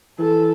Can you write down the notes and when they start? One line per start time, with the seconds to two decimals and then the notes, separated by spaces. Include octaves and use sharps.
0.19 E3 A4